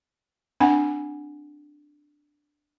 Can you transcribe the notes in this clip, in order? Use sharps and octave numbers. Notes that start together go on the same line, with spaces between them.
C4 D4 F#5 G#5